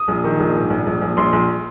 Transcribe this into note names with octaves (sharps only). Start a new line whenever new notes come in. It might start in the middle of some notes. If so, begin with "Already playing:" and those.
Already playing: D#6
A#1
D#3
A#1
G#2
A#1
A#1
A#1
A#1 C6
A#1